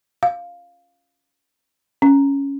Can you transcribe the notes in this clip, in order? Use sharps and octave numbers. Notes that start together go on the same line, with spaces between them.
F5
C#4